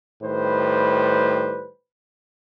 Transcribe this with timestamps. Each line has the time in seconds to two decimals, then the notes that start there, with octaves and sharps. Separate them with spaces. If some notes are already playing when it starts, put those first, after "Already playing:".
0.22 A2 D#3 G3 B4 C5